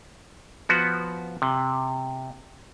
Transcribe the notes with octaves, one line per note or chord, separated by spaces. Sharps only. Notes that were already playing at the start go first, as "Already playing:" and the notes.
F3 B3 F#4
C3